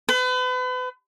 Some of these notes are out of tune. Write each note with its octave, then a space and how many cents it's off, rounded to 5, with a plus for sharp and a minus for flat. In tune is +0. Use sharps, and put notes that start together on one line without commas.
B4 +35